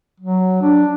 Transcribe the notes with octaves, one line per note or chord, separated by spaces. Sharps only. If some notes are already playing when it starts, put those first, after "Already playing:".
F#3
D4